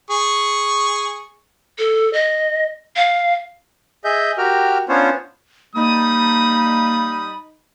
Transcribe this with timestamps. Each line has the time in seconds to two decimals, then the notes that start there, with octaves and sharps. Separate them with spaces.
0.11 G#4 C#6
1.79 A4
2.13 D#5
2.96 F5
4.04 G#4 D#5 E5 G6
4.38 F#4 G4 A#4 G5 F6
4.89 B3 C#4 D4 F4 C5 C#5
5.76 G3 A#3 D#4 B5 D#6